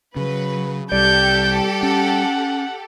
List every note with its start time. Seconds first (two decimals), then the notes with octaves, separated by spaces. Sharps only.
0.16 C#3 F#3 B4
0.92 C2 G3 G4 A4 D5 G6
1.83 C#4 F#5